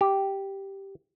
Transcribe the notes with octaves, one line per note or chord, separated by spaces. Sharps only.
G4